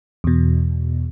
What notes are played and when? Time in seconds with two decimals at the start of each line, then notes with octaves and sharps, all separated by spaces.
0.24 E2 B2